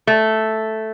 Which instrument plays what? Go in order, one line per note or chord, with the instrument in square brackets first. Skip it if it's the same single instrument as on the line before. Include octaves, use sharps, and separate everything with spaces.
[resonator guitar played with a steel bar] A3